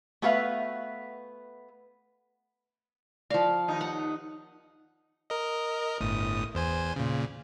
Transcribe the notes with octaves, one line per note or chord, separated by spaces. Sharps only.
A3 B3 F#4 B4 E5 F5
F3 D5 F5
D#2 D#4
F#5
A#4 D#5
G1 A2 D#6
E2 C5 G#5
A#2 C#3